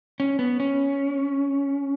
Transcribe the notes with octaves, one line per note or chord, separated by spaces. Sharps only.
C#4
B3
C#4